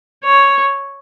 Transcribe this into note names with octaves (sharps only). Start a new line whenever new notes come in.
C#5